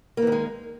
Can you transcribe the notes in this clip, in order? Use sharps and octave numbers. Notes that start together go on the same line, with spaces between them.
D#3 E3 G#3 A#3